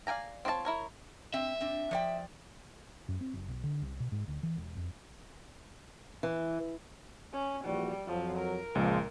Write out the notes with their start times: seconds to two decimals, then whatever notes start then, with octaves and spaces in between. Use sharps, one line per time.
0.07 D5 F5 G5 G#5 A#5
0.45 C4 F4 C#5 D#5 A5
0.65 E4 A#4 C#5
1.34 C4 E5
1.61 C4 D4
1.91 F3 D5 G5
3.08 F#2
3.21 C4
3.34 F#1
3.49 B1
3.63 D3
3.82 C2
4.00 B2
4.12 G#2
4.28 D2
4.43 E3
4.57 E1
4.77 F2
6.23 E3
7.33 C#4
7.64 A#1 E2 G3 F#4
8.07 F2 F3 F#3
8.38 A#4
8.75 C#2 A#2 F3 G#3